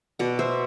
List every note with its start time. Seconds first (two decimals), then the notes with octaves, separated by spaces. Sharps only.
0.19 B2 D5 F#5
0.39 C5 E5